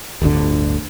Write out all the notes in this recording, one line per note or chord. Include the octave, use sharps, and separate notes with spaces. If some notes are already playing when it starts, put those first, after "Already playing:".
D1 G1 D2 D3